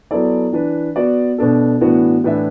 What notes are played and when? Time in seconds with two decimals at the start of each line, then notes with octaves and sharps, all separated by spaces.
0.11 F#3 B3 E4 A4 D5
0.53 E3 D4 B4
0.96 B3 F#4 D5
1.38 B2 B3 D4 A4
1.81 A2 E3 B3 D4 F#4
2.24 A2 E3 D4 B4 E5